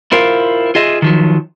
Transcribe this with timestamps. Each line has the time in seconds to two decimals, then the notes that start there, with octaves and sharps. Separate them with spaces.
0.12 E4 F4 A#4 C5 F5
0.75 F4 G#4 D#5 E5
1.02 D#3 F3 F#3